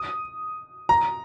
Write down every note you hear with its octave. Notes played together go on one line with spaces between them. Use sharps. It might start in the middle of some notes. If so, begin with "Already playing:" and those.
Already playing: D#6
A#5